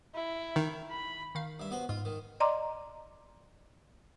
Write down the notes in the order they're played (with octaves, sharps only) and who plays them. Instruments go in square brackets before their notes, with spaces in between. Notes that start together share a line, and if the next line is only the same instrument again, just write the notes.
[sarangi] E4
[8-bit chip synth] D#3
[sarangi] B5
[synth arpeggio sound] D#3 F5
[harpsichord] G2 E5
B3 F#4 C5
[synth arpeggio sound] G#2 [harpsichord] F4
[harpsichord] D#3
[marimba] D5 D#5 A#5 C6 D6